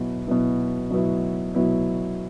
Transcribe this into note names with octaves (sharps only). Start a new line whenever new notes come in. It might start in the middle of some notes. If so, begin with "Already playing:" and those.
Already playing: B2 F#3 B3 E4
B2 F#3 B3 E4
B2 F#3 B3 E4
B2 F#3 B3 E4